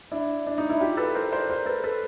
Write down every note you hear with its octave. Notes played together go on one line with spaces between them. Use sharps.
D4 E4
D4
D#4
D4 E4
F4 G4
A4 B4
A#4 C5
C5 D5
A#4 C5
A4 B4
A4 B4